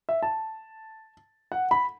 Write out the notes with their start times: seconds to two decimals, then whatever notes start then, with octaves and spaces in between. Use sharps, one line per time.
0.09 E5
0.23 A5
1.52 F#5
1.71 B5